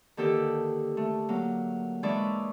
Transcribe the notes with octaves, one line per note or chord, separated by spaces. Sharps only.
D3 D#3 A#3 G4 A4
A3
F#3 A#3
E3 G#3 D4 D5 E5 C#6